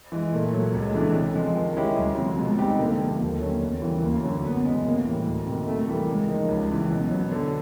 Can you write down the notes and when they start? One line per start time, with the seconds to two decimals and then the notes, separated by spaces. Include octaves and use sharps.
0.12 E3 G#3
0.32 A#2 A3
0.53 F#3 A3
0.74 C#2 G#3
0.94 C#3 E3 A3 D4
1.14 C3
1.36 F3 G#3
1.55 D#3
1.76 G#3 C#4 E4 G4
1.97 D2 G3
2.18 C3 F3
2.38 B2 G#3
2.58 G3 C4 D#4 G4
2.79 D3 A#3
3.00 F3 A3
3.20 D#2 A#3
3.41 D3 F#3 A3 C#4
3.61 E2
3.81 C#3 E3 G3 A#3
4.02 D2 A#3
4.23 D3 F#3 A3 C#4
4.43 F#2 B3
4.64 C#3 E3 G#3 B3
4.84 A2 A#3
5.05 E3 G3
5.26 D2
5.46 C3 D#3
5.67 C3 A3
5.87 E3 G3 A#3
6.08 C#3 G#3
6.29 F3 A#3 D#4
6.49 C#2 G3
6.70 C#3 E3
6.90 B2 F#3
7.11 F#3 B3
7.32 D3